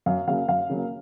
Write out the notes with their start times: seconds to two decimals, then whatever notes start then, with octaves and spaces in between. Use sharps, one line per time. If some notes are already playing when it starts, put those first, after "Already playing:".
0.06 F#2 F5
0.27 C#3 F#3 A#3 F5
0.49 F#2 F5
0.70 C#3 F#3 A#3